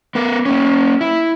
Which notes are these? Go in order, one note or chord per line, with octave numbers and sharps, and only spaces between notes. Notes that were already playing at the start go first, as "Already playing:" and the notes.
B3 A#4
A#3 C#4
E4